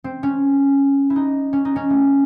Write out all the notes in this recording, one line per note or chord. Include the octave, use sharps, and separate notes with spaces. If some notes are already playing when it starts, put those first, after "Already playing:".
C4
C#4
E4
D#4
C#4
D#4
C#4
A3